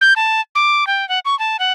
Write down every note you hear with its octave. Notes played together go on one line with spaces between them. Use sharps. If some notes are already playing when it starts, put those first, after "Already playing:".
G6
A5
D6
G5
F#5
C#6
A5
F#5